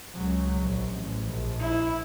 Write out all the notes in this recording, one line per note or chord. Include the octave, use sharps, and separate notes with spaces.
C#2 F#3
A#1
A1
A#1
E4